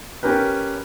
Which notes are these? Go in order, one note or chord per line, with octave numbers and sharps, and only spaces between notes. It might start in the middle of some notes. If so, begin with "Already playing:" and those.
C#4 G4 A#4 B4